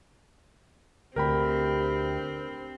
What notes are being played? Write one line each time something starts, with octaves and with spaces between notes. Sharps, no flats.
D2 C4 G4 A#4 G5 B5